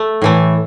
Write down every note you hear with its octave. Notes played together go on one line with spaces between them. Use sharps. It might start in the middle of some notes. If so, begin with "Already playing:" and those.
Already playing: A3
A2 E3 A3